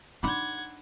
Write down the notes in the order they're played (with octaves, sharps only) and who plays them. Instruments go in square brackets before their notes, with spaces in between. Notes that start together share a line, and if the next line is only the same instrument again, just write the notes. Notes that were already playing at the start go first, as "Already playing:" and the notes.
[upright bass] D4 D#4 [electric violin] F#5 G#6 [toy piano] B5 C6 D6